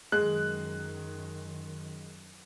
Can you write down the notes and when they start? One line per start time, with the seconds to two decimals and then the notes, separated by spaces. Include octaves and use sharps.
0.12 F#2 D#3 G#3 F#6